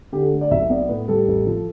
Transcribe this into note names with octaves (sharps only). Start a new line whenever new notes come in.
D3 G4
A4
A3
D5
B1 E5
B3 D5
A2 B4
G3 A4
A1
F3